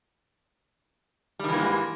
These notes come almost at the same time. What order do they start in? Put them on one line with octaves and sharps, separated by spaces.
G3 D#3 E3 A#3 G#2